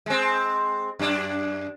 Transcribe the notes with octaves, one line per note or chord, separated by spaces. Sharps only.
G#3 C4
F#2 D4